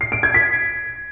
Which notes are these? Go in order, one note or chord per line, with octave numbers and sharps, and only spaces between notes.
C7
D7
G#6
B6